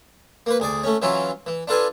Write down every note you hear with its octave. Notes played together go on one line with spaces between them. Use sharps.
A#3 B4
D2 G#4 D5
A3 C#4
E3 F#3 C#4 E4 F4
E3
D4 F4 A4 B4 G#5